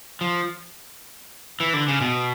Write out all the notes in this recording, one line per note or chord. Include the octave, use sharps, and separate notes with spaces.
F3
E3
D3
C#3
B2